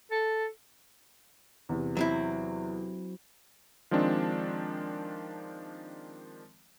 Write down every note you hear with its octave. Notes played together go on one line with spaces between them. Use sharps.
A4
E2 C3
F#3 C4 E4
D#3 F3 G#3 C4 D4